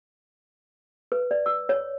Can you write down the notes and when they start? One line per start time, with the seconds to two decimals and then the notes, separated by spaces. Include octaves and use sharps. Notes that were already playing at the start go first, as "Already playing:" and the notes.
1.12 B4
1.31 D5
1.46 E6
1.69 C#5